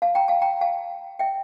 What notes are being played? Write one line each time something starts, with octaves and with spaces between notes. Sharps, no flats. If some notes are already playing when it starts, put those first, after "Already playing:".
F5 A5
G5 A#5
F5 A5
G5 A#5
F5 A5
E5 G5